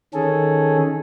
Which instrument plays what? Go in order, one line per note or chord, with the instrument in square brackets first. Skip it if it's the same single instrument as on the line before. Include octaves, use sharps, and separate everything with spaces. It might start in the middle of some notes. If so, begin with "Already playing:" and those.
[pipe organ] D#3 C#4 G#4 A4